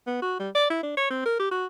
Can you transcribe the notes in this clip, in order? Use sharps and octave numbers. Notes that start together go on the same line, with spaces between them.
B3
F#4
G3
D5
E4
D4
C#5
C4
A#4
G4
F#4